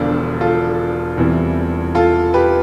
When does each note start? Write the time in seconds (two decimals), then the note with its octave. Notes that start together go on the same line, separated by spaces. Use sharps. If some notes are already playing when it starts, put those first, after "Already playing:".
Already playing: E1 E2 D3 F3 D4 F4
0.41 F4 A4
1.17 E2 C3 E3 G3
1.95 F4 A4
2.34 G4 B4